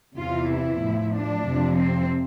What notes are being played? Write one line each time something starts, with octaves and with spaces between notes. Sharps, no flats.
E2 C3 E3 F4
E4
A2 F3
D4
F2 C3 F3
C4